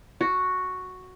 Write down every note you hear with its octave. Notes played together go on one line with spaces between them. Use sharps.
F#4